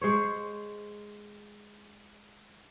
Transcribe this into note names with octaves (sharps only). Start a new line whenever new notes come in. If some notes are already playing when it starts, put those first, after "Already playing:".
G#3 C5 C#5